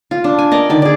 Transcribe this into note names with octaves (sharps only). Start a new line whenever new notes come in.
F4
D4
G#5
A#4 D5 D#5
D3 D#3 D5
G#4 D5